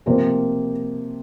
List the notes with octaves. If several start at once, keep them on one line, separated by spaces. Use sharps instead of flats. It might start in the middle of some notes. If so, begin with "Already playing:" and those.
C3 F3 A#3 C5